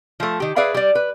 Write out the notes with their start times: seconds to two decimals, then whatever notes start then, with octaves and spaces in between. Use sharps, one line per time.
0.20 F3 A3
0.40 D#3 G4
0.56 G#4 B4 D5 E5 F5
0.75 G3 D5
0.95 B4